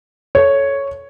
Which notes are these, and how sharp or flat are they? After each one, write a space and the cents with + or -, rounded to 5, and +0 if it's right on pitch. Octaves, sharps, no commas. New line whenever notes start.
A4 -10 C#5 +0